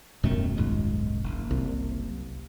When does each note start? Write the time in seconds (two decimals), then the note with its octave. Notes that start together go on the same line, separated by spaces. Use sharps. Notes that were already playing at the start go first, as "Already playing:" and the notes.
0.23 D#1 F#2 B2 D#3 A3
0.57 B1 G#2 G#3
1.24 F#1
1.51 C2